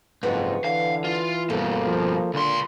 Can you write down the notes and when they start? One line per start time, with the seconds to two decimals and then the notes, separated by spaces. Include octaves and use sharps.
0.23 F#1 F2 G#2 B4 C#5 F#5
0.65 D3 E3 F5
1.04 F4
1.50 G2 B2 A#3 A4
1.87 F3
2.34 C#2 A#2 D3 C6